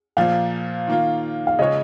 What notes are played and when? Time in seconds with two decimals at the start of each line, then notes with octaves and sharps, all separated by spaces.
0.17 A#2 F3 A#3 F5
0.87 D#3 A#3 F4
1.47 F5
1.59 C#3 G#3 F4 C#5 D#5